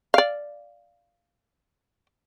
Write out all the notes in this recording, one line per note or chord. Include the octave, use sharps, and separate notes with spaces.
D5 F5